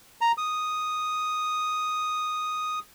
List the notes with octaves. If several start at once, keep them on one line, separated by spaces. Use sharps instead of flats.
A#5
D#6